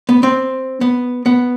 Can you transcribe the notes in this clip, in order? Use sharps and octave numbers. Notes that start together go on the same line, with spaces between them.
B3
C4
B3
B3